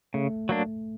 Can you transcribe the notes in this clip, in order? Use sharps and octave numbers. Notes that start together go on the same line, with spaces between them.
C#3 A3
F#3 A#3 D4